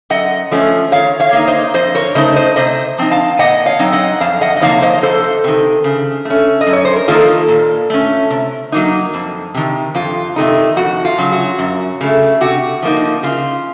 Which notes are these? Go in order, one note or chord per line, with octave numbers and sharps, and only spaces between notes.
F#2 D#5 F#5
F3 A3 C#4
D#3 C#5 F5
C#5 F5
A#3 D#4
C5 D#5
F2 C5 D#5
A#4 C#5
C#3 A3 D#4 C5 D#5
C5 D#5
C3 C5 D#5
F3 C4 D#4
F5 A5
A#2 D#5 F#5
C#5 F5
F#3 C4 D#4
D#5 F#5
F2 F5 A5
D#5 F#5
D#5
C3 F3 A#3 D#4 C#5 F5
C5 D#5
F2 A4 C5
C3 D#3
C#3
A3 C#4
D#5
F#2
C#5
C5
A#4
D#3 A#3 D#4 F4 A4
A#2
A3 C#4
C3
F#3 A#3 D#4
F2
C3 D#3
F2 F4
C3 D#3 A3 D#4
F2 F#4
F4
C#3 F#3
F#4
F#2
C#3 A3
C3 F#4
F3 A#3 D#4
C#3 F4